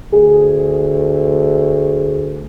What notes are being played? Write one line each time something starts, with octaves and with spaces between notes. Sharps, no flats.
D2 G#4